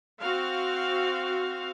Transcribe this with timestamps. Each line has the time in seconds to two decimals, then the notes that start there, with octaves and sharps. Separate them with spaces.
0.21 C4 F#4 F5